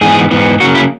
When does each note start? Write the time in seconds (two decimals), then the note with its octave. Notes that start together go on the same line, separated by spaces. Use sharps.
0.01 G#2 E3 B3 G#4
0.31 G#2 E3 B3
0.60 C#3 F#3 A#3 F#4
0.75 E4